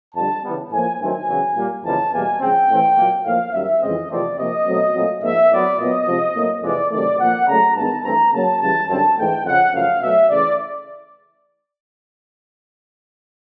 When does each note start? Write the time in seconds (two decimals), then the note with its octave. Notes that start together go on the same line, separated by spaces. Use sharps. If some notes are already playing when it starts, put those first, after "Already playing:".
0.15 F2 D3 G3 A5
0.43 C#3 E3 G3 B3
0.72 A2 F3 A#3 G#5
1.00 G2 D#3 F#3 A3 C4 G#5
1.28 E2 C#3 F#3
1.56 A#2 G3 A#3
1.84 F2 C#3 E3 G3 A#3 A5
2.13 E2 B2 G3 A#3 G#5
2.41 C#3 F3 G#3 C4 G5
2.69 A2 E3 A3 C4
2.97 A#2 F#3 A#3
3.25 A2 F3 A#3 F5
3.53 F#2 D#3 G3 E5
3.82 F2 C#3 E3 G#3 C4 D#5
4.10 E2 C3 F3 A3 C4 D5
4.38 C3 F3 A#3 D#5
4.66 B2 F#3 A3 C4
4.94 A#2 F#3 A3 C4
5.22 G#2 F3 A#3 E5
5.51 A2 F#3 B3 D5
5.79 A#2 F#3 B3 D#5
6.07 C3 F3 G#3 C4
6.35 A2 F#3 A#3
6.63 F2 C3 E3 G#3 D5
6.91 C3 D#3 F#3 A3 D5
7.20 A#2 F3 A#3 F#5
7.48 C#3 F#3 A3 A#5
7.76 G2 D#3 G#3 B3 A5
8.04 G2 E3 A3 C4 A#5
8.32 C#3 F#3 A#3 A5
8.60 C#3 E3 G3 A5
8.89 F#2 D3 G3 C4 A5
9.17 G#2 E3 A3 G5
9.45 F2 C#3 F3 F#5
9.73 F#2 C#3 F3 A3 F5
10.01 B2 F#3 A3 E5
10.29 C#3 E3 A3 D5